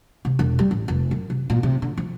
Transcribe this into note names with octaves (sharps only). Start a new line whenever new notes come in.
C3
E1
G3
A1
F1
F#2
C3
A#2
C3
D3
F3